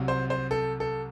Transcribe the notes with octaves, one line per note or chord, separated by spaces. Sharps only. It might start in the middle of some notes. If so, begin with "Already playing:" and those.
Already playing: C2 C3 F#3
C5
C5
A4
A4